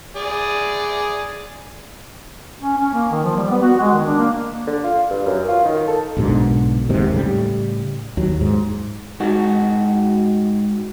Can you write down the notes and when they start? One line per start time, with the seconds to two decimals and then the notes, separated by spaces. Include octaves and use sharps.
0.16 G#4 D5
2.62 C#4
2.78 C#4
2.94 A#3
3.11 D#3
3.24 F3
3.36 G3
3.50 B3
3.63 F#4
3.80 G#3
3.93 D#3
4.06 D4
4.19 A#3
4.67 D3
4.84 F4
5.10 G2
5.26 F#2
5.48 F4
5.65 D#3
5.88 A4
6.17 B1 G#2 B2 D3
6.88 E1 D#2 G#2 C3
7.12 A2 C#3 G3
8.17 D#2 F#3
8.41 G#2
9.20 G#2 F#4